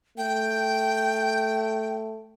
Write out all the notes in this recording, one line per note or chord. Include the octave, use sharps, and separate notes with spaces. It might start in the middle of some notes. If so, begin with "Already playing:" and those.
A3 G5